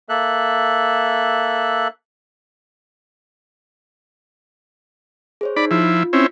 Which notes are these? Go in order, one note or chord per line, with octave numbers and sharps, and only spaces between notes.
A#3 A4 E5 F#6
G#4 C5 C#5
D#4 D5 B5
F3 E4 F4
C4 C#4 E4